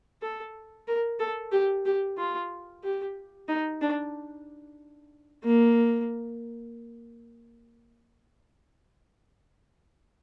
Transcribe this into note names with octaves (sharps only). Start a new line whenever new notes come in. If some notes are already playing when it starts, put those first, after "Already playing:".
A4
A#4
A4
G4
G4
F4
G4
D#4
D4
A#3